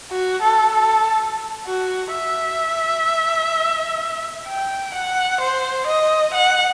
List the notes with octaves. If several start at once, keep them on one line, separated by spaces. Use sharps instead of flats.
F#4
A4
A4
F#4
E5
G5
F#5
C5
D#5
F#5